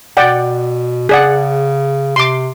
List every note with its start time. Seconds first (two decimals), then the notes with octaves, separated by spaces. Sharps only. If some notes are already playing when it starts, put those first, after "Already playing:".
0.17 B2 D5 F#5 G5
1.09 C#3 G#4 D5 F#5
2.16 C3 C6 D6